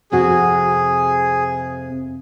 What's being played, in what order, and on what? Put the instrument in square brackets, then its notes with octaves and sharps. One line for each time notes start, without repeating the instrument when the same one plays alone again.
[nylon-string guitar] F2 C3 F#4 [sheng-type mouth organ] G#4